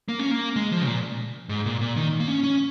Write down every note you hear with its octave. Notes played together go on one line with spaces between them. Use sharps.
A#3
C#4
A#3
G#3
F3
C#3
A#2
G#2
A#2
A#2
D#3
A#3
C#4
C#4